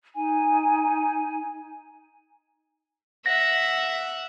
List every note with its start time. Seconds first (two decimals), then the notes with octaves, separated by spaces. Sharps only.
0.14 D#4 G#5
3.26 E5 F#5 A#6